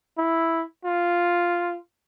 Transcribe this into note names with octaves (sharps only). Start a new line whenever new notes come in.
E4
F4